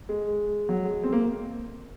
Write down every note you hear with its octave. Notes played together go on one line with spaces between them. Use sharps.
G#3
F#3
G#3
C4
A#3